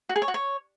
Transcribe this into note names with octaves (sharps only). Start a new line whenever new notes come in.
F#4
G#4
C#5
F#4
C#5